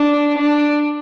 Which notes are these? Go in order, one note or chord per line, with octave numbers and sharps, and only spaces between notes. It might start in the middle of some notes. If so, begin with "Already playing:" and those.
Already playing: D4
D4